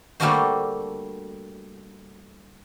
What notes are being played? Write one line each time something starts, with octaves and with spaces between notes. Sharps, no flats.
G3 A3 A#3 D4 F#4 C5